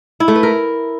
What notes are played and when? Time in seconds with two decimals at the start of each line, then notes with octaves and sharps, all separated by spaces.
0.20 E4
0.28 A3
0.36 B4
0.43 A#4